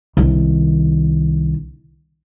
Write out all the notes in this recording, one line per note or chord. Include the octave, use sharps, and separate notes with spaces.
C2 D#3